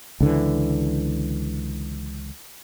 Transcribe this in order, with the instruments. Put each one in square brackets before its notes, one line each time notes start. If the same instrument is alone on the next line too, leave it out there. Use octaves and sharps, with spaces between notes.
[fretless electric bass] C#2 D3 E3